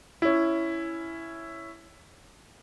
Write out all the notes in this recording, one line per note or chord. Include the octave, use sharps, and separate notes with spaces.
C#4 E4